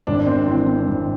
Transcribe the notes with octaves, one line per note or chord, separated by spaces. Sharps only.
G#1 D4
C4
E3 C4
C4
G#1